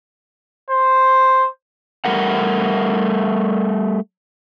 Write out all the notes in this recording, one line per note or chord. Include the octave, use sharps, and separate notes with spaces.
C5
G3 A3 A#4 F#5